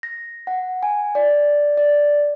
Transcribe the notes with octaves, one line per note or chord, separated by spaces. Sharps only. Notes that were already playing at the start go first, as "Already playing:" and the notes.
A#6
F#5
G#5
D5
D5